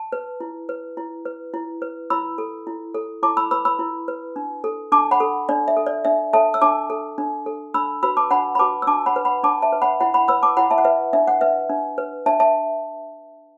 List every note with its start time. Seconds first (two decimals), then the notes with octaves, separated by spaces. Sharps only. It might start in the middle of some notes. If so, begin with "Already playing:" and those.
Already playing: A5
0.12 B4
0.40 E4
0.69 B4
0.97 E4
1.25 B4
1.54 E4
1.82 B4
2.10 E4 B5 E6
2.38 A4
2.67 E4
2.95 A4
3.23 E4 A5 D6
3.37 B5 E6
3.51 B4 B5 E6
3.65 B5 E6
3.79 E4
4.08 B4
4.36 D4
4.64 A4
4.92 D4 A5 D6
5.11 F#5 B5
5.20 A4
5.49 D4 D5
5.68 E5
5.77 A4
5.86 D5
6.05 D4 E5
6.33 A4 E5 A5
6.54 E6
6.62 D4 A5 D6
6.90 A4
7.18 D4
7.46 A4
7.74 D4 B5 E6
8.03 F#4 B4 B5 E6
8.17 A5 D6
8.31 D4 F#5 B5
8.55 B5
8.59 F#4 B4 A5 D6
8.82 E6
8.87 D4 A5 D6
9.06 F#5 B5
9.16 B4
9.25 F#5 B5
9.44 D4 A5 D6
9.62 E5 A5
9.72 B4
9.82 F#5 B5
10.01 E4 F#5 B5
10.14 F#5 B5
10.28 B4 B5 E6
10.42 A5 D6
10.57 E4 F#5 B5
10.71 E5 A5
10.78 F#5
10.85 B4 E5
11.13 D4 E5
11.28 F#5
11.41 B4 E5
11.70 D4
11.98 B4
12.26 D4 E5 A5
12.40 E5 A5